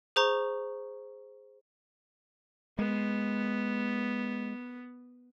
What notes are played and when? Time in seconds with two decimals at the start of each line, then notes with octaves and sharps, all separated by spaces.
0.16 G#4 C5 A#5 C#6
2.79 G#3 B3